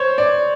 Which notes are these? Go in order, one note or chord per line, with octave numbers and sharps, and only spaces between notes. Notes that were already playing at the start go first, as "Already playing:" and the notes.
Already playing: C5 C#5
D5